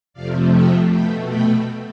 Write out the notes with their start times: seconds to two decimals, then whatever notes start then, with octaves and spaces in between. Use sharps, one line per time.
0.13 F2 C3 F3 A3 D5 F5
0.51 E5 G5
0.90 B2 A3 G5 B5
1.28 G5 B5